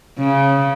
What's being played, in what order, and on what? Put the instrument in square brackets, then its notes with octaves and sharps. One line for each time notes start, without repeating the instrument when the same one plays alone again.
[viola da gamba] C#3